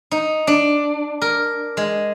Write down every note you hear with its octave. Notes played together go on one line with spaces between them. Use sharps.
D#4
D4
A#4
G#3